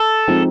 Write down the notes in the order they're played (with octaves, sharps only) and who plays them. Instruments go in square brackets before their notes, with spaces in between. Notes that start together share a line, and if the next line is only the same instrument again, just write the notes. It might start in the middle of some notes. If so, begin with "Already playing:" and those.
Already playing: [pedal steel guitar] A4
[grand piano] F3 G#3 C4 D#4